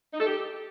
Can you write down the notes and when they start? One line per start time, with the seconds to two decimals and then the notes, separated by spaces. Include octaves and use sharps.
0.14 D#4
0.20 A4
0.27 G4